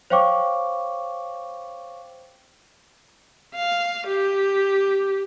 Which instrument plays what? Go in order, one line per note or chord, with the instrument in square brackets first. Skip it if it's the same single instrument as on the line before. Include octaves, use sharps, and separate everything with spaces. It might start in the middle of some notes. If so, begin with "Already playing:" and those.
[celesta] C5 C#5 F5 G5 C#6 D6
[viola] F5
G4